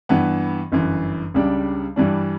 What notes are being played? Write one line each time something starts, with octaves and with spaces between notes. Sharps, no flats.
G2 E3 B3
G1 F#2 E3
C#2 C#3 G3 D4
G2 E3 G3 D4